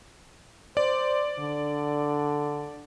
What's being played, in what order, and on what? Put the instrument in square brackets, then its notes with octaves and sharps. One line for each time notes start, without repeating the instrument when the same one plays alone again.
[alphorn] C5 [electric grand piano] D5
[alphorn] D3